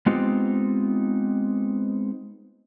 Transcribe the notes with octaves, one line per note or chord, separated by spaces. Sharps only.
G#3 B3 C4 D#4 F4 G4